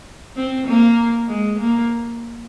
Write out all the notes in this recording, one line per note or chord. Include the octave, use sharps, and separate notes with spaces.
C4
A#3
G#3
A#3